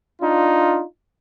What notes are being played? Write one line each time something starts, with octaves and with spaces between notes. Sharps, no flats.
D4 D#4 F4